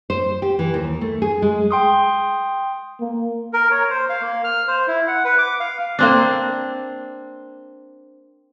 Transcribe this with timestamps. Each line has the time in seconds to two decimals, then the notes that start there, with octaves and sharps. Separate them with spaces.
0.10 C5
0.42 G4
0.59 E3
0.74 D#2
1.01 A3
1.22 G#4
1.42 G#3
1.71 G5 C6 D#6
3.00 A#3
3.53 A#4
3.71 C#5
3.90 C5
4.09 F5
4.21 A#3
4.44 F6
4.68 C5
4.87 E4
5.08 F#5
5.25 B4
5.38 D6
5.60 F5
5.99 A#3 C4 D4